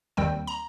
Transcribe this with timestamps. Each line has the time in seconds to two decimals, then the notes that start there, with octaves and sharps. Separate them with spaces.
0.17 D#2 D#3 G3 C4 G5
0.47 A#5